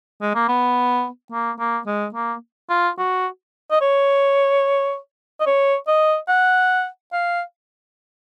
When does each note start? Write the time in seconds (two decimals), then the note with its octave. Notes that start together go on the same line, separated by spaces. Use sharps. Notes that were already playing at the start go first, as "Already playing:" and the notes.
0.22 G#3
0.35 A#3
0.48 B3
1.32 A#3
1.59 A#3
1.86 G#3
2.14 A#3
2.69 F4
2.98 F#4
3.71 D#5
3.81 C#5
5.40 D#5
5.46 C#5
5.87 D#5
6.28 F#5
7.12 F5